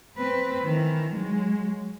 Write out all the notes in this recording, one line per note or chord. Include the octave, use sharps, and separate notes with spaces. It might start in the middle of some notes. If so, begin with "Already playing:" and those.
C4 B4
D#3 E3
F#3 G#3